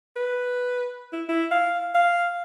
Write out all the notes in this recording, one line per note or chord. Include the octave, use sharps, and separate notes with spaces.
B4
E4
E4
F5
F5